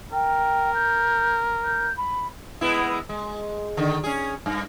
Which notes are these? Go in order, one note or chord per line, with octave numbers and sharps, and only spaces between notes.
A#4 G5
G6
G6
B5
G#3 B3 E4
G#3
D3 D#3
C#4 G#4
G2